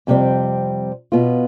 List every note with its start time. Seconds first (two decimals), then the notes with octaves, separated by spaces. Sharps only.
0.07 F2 C3 G3 C4
1.12 B2 B3 F4